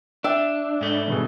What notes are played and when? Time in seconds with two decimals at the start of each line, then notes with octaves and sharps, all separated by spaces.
0.24 D4 E5 G5
0.81 G#2 A3
1.08 G2 B2 G#4